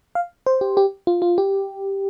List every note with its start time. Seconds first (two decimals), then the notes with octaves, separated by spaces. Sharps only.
0.15 F5
0.46 C5
0.61 G4
0.77 G4
1.07 F4
1.22 F4
1.38 G4